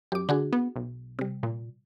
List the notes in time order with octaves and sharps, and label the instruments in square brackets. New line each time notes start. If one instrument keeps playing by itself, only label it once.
[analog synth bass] F#2 [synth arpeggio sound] G4 D6
[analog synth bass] D3 [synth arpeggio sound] D4 F#4 G#4
[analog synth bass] B3
B1
[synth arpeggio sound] C3 G3
[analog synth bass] A#2